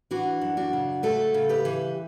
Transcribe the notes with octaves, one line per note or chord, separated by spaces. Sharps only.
E3 D4 F#4
F#2
D4 F#4
C#3
A3 F#4 A4
C#3
G4 B4
E3